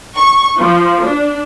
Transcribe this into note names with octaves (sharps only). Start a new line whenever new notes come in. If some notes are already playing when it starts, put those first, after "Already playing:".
C#6
F3
D4